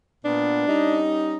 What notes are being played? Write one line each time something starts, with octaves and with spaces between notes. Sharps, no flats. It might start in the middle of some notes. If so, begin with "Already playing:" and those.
A#2 B3 D4
G3 C#4 D#4